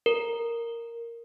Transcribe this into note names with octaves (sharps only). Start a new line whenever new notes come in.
A#4